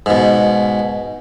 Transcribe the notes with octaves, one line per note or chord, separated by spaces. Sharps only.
G#2 B2